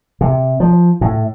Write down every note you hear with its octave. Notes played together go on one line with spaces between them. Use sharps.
C3
F3
A2